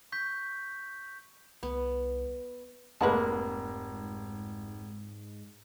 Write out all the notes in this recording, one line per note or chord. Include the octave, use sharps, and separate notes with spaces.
C#6 G6 B6
C2 B3
F1 G#2 G#3 A#3 B4 F#5 A5